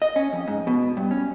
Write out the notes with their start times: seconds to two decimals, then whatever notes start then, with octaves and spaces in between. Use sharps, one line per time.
0.02 D#5
0.16 C#4
0.33 F2
0.48 G#2
0.67 B2
0.97 G2
1.11 C#4